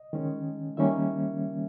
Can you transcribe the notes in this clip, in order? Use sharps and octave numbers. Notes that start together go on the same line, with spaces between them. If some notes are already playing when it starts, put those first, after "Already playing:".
Already playing: D#5
D#3 G#3 C#4
D#3 G3 A#3 C#4 E5